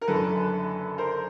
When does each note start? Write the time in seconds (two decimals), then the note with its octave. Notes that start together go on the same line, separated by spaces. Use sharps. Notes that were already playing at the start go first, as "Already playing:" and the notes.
0.01 A#4
0.08 F#1 F#2 D3 F#3 A4 B4
0.98 A#4 C5